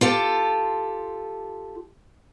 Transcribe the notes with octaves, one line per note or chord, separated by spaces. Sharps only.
F4 G4 A4